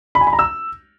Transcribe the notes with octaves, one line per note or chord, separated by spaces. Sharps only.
B5
G#5
B5
A#5
E6